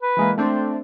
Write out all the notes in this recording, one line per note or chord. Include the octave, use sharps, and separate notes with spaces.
B4
E3 G#3 A#3
A3 C4 D4 C5